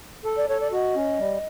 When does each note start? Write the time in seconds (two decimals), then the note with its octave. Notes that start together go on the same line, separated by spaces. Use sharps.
0.24 A4
0.37 D5
0.49 A4 C#5
0.60 D5
0.72 F#4 D#5
0.95 C#4
1.19 G3